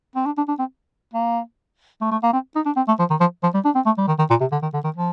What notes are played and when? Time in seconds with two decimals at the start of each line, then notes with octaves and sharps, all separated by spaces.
0.16 C4
0.26 D4
0.37 D4
0.48 D4
0.59 C4
1.14 A#3
2.01 A3
2.11 A3
2.23 A#3
2.33 C4
2.56 D#4
2.66 D4
2.77 C4
2.88 A3
2.99 F3
3.10 D#3
3.20 F3
3.43 F3
3.54 G3
3.65 D4
3.75 C4
3.86 A3
3.98 G3
4.08 D#3
4.19 D#3
4.30 A#2
4.40 C3
4.52 D3
4.62 D#3
4.74 D3
4.84 D#3
4.96 F3